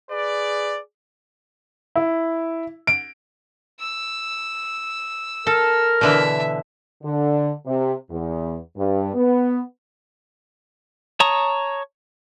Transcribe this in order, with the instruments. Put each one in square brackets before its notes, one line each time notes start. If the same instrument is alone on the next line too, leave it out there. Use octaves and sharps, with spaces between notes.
[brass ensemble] G#4 B4 D5
[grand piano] E4
D7
[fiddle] E6
[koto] A4 [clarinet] A#4
[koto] B2 D3 E3 [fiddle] E5
[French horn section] D3
C3
E2
G2
B3
[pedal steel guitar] C#5 A5 A#5 C#6 D#6